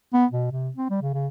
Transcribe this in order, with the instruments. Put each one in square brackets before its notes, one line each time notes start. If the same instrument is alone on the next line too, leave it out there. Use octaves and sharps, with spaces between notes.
[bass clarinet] B3
B2
C3
C4
G3
C#3
C#3